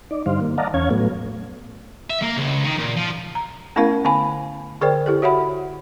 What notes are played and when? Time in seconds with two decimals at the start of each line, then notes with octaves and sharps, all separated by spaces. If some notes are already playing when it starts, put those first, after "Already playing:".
0.11 D#4 D5
0.26 G2 D3 G3 D#4 C5 F5
0.41 D#3 A#3
0.58 D5 D#5 F5 F#5 A5 A#5
0.74 E2 C#4 C#5 F5 G#6
0.91 A2 F#3 A3 B3
2.10 E5
2.22 A#3
2.37 C#2
2.64 D#3
2.78 A#2
2.96 F3
3.35 A#5
3.76 A3 B3 C#4 E4 A#4 F5
4.04 D3 B3 F5 G#5 B5
4.81 D3 G#4 A#4 C5 D5 G5
5.06 E4 G4 A4
5.22 F#4 C#5 E5 F#5 B5